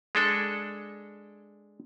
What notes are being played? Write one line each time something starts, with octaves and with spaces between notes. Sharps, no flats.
G#3 D4 A4